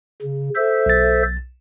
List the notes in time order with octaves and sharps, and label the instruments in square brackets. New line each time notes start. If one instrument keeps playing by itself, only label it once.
[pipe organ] C#3
A4 C5 E5
[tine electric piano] B1 A6